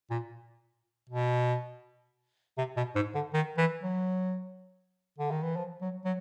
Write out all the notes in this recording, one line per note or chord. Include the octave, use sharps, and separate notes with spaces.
A#2
B2
C3
B2
G#2
D3
D#3
E3
F#3
D3
D#3
E3
F3
F#3
F#3